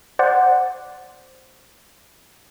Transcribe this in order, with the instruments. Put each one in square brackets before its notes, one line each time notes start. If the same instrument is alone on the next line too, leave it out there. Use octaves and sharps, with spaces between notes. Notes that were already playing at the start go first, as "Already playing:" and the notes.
[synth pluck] C5 D5 F#5